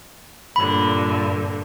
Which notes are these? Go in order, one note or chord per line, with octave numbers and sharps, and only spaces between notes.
G2 A#2 D3 B5